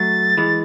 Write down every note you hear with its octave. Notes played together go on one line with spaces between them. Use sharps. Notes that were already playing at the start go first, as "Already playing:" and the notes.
Already playing: F#3 A3 A6
E3 G#3